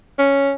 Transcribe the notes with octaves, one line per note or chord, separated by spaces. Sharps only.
C#4